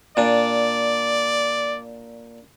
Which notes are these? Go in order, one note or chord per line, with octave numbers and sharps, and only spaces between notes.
A#2 D4 D5